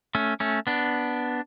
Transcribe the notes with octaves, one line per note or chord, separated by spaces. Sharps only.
A3 C#4
A3 C#4
B3 D4